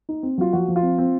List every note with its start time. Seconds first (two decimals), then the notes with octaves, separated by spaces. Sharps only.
0.09 D#4
0.23 C4
0.38 F#3 F4
0.53 F3 F#4
0.68 F3
0.76 F4
0.82 C4
0.98 C4